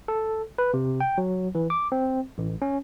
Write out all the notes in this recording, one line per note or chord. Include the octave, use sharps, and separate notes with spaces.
A4
B4
C3
G5
F#3
E3
D6
C4
A1
C#4